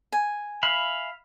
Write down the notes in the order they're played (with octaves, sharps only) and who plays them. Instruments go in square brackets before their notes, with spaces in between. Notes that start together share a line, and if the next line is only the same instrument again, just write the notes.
[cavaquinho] G#5
[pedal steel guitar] E5 F5 B5